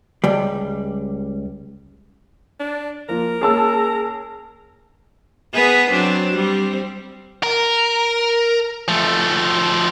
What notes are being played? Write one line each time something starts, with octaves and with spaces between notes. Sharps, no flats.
C#2 G3
D4
F3 A#3 F4 A#4
A#3 C#4 G#4 A5 E6
B3 G#4 B4
F#3 C4 D4
G3 C4
A#4
F3 A3